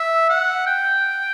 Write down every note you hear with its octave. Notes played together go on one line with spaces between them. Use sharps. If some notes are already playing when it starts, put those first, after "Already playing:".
Already playing: E5
F#5
G5